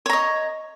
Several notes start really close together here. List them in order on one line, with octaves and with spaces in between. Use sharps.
C#5 A#5 D#5